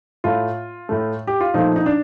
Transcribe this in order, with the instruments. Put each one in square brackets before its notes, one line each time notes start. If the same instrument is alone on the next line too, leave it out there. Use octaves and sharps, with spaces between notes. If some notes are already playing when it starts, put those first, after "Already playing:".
[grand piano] A2 A3 F4
A2 A3
G4
F4
A#2 F3 A3 D#4
D#4
D4